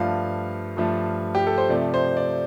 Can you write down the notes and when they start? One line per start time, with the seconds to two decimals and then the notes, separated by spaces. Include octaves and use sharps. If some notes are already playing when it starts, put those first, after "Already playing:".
Already playing: G2 F3 A3 F5
0.77 G2 F3 A3
1.35 G4
1.47 A4
1.58 C5
1.69 C3 F3 A3 D5
1.94 C5
2.17 D5